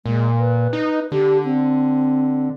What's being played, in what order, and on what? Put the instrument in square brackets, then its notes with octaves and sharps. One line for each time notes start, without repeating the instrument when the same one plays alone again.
[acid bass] A#2 [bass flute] G#3
[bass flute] B4
[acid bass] D#4
[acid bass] D3 [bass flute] G4
[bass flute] C4